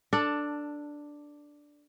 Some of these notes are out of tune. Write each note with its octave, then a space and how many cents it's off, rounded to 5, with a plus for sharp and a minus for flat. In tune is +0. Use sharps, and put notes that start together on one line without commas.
D4 +0 A4 +15